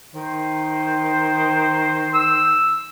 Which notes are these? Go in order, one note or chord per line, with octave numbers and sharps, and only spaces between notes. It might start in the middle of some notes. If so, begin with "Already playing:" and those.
D#3 C5
E6